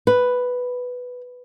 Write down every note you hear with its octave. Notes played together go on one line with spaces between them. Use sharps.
B4